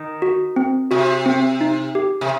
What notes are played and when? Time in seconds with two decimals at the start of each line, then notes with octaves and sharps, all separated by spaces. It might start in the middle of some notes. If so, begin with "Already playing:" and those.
Already playing: D#3
0.22 F#4
0.56 C4
0.91 C3 F#4
1.26 C4
1.61 D#4
1.95 G4
2.21 C3